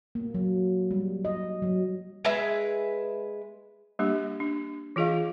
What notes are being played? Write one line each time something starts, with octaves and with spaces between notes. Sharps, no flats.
A#3
F#3
G3
D#5
F#3
G#3 G#4 B4 E5
G3 A#3 D4 G4
D4
E3 F4 G#4 D#5 F5